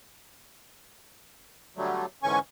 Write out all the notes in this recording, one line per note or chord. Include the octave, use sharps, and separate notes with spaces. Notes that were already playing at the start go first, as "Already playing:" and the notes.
D3 F#3 G3 A3
G#2 D3 E3 C#4 G#5 C#6